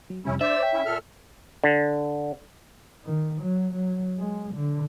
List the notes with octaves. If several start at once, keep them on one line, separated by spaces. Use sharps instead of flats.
F#3
F2 C3 G3 C#4 E4
D4 C5 D5 E5
C#5 G5
C#4 E4
A#2 A4 F6
D3
D#3
F#3
F#3
G#3
D3